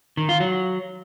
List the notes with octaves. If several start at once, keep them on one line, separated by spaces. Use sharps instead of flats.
D#3
F4
F#3